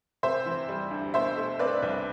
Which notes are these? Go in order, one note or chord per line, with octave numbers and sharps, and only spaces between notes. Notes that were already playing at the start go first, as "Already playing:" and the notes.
C3 C5 E5
E3
G3
D2
B2 C5 E5
A3
C4 B4 D5
C2